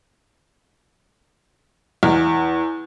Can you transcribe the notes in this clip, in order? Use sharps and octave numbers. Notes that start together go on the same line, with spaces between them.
E2